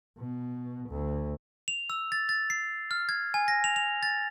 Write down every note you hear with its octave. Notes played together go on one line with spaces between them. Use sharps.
B2
D2
F7
E6
A6
A6
C7
F6
G#6
G#5
A#6
F7
F7
A6